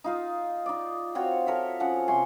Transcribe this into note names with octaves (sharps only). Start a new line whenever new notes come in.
D#4 F4 F5
D#4 D5
C4 F4 F#4 C#5
A4 A#4 C#5 E5
F3 C#4 F#5
C3 G#5 C6 C#6